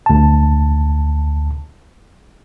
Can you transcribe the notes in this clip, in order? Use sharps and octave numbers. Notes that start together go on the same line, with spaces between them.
D2 A5